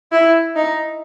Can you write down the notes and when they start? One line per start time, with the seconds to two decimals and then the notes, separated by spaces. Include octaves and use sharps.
0.12 E4
0.56 D#4